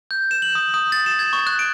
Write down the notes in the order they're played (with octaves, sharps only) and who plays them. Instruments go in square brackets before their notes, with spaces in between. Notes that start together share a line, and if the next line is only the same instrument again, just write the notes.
[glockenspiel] G6
E7
F#7
D#6
D#6
A6
E7
G#6
C#6
F#6
D7